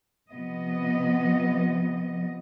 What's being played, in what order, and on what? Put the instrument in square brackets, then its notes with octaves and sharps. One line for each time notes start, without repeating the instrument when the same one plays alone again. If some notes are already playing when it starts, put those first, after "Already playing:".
[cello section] C3 F3 B3 D#5